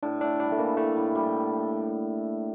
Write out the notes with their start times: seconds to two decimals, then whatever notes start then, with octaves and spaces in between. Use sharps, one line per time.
0.03 A2 D4
0.21 A2 D4
0.40 G3 D4
0.52 A3
0.59 E3 A#3
0.77 A2 A3
0.96 A2
1.15 G3